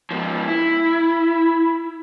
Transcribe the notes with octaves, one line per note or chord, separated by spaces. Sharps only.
G#2 F3
E4